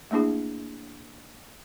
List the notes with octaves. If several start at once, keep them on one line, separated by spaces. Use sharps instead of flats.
A3 A#3 D4 E4 G#4